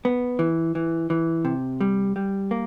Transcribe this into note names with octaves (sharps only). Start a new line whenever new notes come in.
B3
E3
E3
E3
C3
G3
G3
A#3